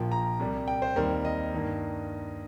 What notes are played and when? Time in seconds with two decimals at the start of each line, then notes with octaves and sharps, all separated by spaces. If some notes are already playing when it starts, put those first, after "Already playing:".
Already playing: A#1 A#2 F3 A#3 G5
0.12 A#5
0.40 C2 C3 G3
0.68 G5
0.82 C5
0.96 D#2 D#3 G3 C4 A#4
1.25 D#5
1.52 G2 D#3 A#3